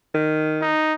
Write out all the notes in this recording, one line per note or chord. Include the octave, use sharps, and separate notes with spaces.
D#3
D#4